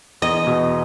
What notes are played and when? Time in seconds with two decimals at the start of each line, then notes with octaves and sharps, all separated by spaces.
0.22 E2 D#5
0.47 B2